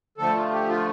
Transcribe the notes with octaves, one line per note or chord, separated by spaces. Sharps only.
D3 F3 A3 A4
F4
G4
F4